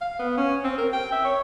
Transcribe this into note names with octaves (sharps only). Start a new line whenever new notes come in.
F5
B3
C#4
C4
A#4
G5
E5
C#5